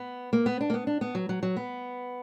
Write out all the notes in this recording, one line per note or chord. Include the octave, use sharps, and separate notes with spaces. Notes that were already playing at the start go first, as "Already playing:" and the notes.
Already playing: B3
A#3
B3
D4
A#3
B3
D4
B3
F#3
F#3
F#3
B3